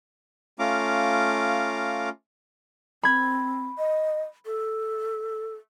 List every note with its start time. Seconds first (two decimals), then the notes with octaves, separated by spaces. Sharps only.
0.59 A3 C#4 F4 F5 A#5 D6
3.03 C4 B5 G#6
3.78 D#5
4.46 A4